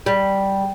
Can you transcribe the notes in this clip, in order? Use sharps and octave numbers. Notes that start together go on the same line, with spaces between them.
G3